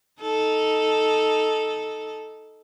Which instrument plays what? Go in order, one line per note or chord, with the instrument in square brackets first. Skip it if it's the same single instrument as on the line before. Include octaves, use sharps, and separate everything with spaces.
[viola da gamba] D#4 A4